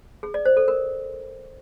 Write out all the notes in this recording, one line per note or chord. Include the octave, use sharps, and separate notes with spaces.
G#4
D5
C5
A4
A#4